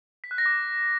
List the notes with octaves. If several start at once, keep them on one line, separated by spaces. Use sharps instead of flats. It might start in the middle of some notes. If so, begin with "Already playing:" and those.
B6
F#6
A#6
D6